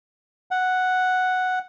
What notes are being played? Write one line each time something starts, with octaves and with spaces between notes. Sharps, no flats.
F#5